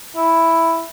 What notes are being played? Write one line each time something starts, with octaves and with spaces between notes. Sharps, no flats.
E4